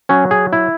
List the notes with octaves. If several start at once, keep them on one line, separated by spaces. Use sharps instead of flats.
F#3 C#4
G#4
E4